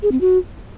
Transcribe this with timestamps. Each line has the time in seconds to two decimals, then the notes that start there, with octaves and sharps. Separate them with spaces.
0.03 G#4
0.12 C4
0.21 F#4